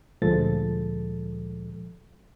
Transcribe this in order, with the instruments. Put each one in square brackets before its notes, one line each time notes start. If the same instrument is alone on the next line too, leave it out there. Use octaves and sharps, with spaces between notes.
[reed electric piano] D2 A#2 F3 G#3 A4 A6